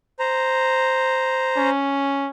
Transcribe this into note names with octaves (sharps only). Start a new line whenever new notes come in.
C5 A#5
C#4